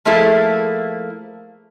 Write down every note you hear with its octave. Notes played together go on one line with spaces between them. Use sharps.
F3 A3 A#3 E4 G#4 A4